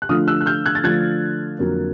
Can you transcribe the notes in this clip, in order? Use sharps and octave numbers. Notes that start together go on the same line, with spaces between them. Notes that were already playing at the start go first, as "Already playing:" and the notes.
F#6
D3 F3 A3 D4 F4 D#6 F6
E6 F#6
F#6
F6 G6
F#6 G#6
A6
D3 F3 A3 D4 F4 F#6 G#6
F2 D3 F#3 A#3